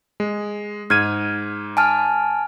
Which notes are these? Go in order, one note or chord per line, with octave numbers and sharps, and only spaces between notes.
G#3
G#2 F6 G#6 D#7
G#5 A5 F6